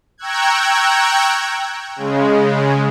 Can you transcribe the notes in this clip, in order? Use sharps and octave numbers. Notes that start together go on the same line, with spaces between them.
G5 A#5 C#6 E6 F#6 G#6
C#3 G#3